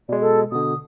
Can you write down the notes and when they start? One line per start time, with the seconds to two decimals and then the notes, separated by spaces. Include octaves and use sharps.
0.09 B2 G#3 D5
0.21 A4
0.52 B2 D3 D#6